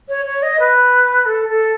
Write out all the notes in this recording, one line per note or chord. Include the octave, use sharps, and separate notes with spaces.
C#5
C#5
D#5
B4
A4
A4